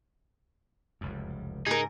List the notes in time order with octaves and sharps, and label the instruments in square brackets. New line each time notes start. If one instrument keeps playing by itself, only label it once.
[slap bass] F1 C#2 F#2
[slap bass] G#2 C#3 [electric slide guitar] D#4 [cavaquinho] G#4 A#4